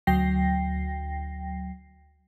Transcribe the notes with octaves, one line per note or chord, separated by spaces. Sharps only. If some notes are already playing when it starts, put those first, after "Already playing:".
D2 F#3 G5 A#6 C7